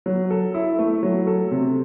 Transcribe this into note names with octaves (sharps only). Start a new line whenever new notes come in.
F#3
A4
E4
A3
F#3
A4
C3